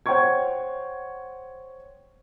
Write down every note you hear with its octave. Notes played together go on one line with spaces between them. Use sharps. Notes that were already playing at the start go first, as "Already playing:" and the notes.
C5 C#5 F#5 G5 C#6 G#6